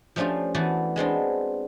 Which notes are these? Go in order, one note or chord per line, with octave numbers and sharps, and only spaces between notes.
F3 A3 C#4 D4 F4 G4
E3 A3 B3 F#4 D5
G#3 B3 C4 D4